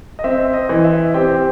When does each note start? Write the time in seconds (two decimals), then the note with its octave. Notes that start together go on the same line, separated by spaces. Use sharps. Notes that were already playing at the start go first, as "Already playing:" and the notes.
0.19 D#5
0.24 C4 E5
0.54 D#5
0.69 E3
0.84 E5
1.14 C4 G4 G5